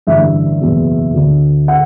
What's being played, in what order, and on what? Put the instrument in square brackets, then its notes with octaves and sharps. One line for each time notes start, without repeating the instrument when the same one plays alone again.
[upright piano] A1 G2 D3 E5
F#1 E2 B2
D2 D3
D3 F#5